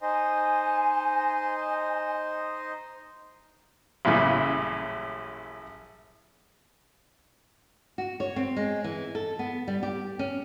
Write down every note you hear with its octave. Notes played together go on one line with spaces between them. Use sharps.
D#4 C5 D#5 G#5
A1 F#2 A#2 C#3 G3 E4
F#4
C#5
C4
G#3
E3
A4
B3
G3
G4
C#4